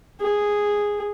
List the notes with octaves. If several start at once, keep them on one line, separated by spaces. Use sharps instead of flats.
G#4